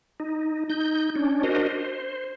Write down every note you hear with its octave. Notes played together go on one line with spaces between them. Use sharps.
D#4
D#4 G6
C#4 D4
D4 F#4 A#4 C5 D#5
C5